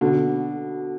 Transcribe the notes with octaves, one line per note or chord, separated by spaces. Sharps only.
B2 D3